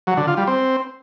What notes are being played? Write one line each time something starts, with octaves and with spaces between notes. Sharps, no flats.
F#3
D3
F4
G3
C4